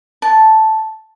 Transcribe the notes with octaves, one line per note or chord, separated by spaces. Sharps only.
A5